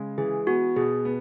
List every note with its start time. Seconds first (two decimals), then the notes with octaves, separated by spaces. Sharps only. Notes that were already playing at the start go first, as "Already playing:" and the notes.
Already playing: C#3 G#3
0.18 E3 G#4
0.47 B3 F#4
0.76 B2 G#4
1.05 B3